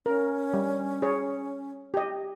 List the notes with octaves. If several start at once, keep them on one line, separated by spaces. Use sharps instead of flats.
C#4 A#4
G3
G#4 C#5
G4 D#5